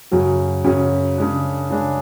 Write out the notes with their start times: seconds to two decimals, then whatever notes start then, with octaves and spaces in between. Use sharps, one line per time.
0.11 F#2 C#3 F#3 C#4
0.64 F#2 C#3 F#3 C#4
1.17 C#3 G#3 D4
1.70 C#3 G#3 D4